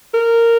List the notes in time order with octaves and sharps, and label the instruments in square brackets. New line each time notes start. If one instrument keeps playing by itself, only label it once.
[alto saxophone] A#4